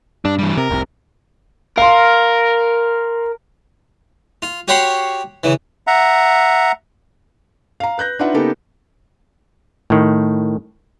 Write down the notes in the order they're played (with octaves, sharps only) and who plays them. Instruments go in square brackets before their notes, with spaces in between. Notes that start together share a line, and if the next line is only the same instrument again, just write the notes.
[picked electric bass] G2 [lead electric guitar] D4
[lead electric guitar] E3 G3
[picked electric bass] C3 [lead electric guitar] A#4
[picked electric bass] F1 C2 C3
[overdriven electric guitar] A#4 [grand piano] F5 C6
[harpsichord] F4
F#4 G4 C#5 F#5 B5 C6
C#3 E3
[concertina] E5 F#5 A#5
[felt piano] F5 A#5
B4 F#6 G6 A#6
D4 D#4 F4 B4 E5 F#5
C#3 A#3 B3 D#4 G4 A4
[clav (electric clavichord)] A2 D#3